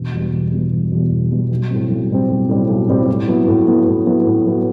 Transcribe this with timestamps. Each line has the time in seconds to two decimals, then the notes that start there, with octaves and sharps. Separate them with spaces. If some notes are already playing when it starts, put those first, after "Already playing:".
Already playing: E1
0.13 E2 B2 G3
0.33 E1
0.52 E2 B2 G3
0.72 E1
0.92 E2 B2 G3
1.11 E1
1.31 E2 B2 G3
1.51 B1
1.70 A2 G3 C4
1.90 B1
2.10 A2 G3 C4
2.30 B1
2.49 A2 G3 C4
2.69 B1
2.88 A2 G3 C4
3.08 A2
3.28 F#3 B3 E4
3.48 A2
3.67 F#3 B3 E4
3.87 A2
4.07 F#3 B3 E4
4.26 A2
4.46 F#3 B3 E4